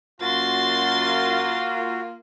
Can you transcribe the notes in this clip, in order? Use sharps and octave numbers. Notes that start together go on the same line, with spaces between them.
F#2 A#3 F4 F#4 C6 A6